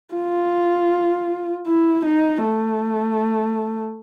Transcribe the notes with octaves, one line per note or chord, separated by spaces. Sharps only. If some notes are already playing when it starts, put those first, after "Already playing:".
F4
E4
D#4
A3